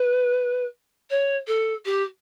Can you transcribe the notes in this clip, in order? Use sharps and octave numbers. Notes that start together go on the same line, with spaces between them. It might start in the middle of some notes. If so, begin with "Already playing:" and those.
Already playing: B4
C#5
A4
G4